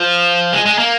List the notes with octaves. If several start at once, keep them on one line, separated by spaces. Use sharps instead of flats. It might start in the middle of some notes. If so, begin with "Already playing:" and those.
Already playing: F3
G#3
G#3
A#3